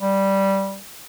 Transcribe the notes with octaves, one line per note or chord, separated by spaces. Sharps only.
G3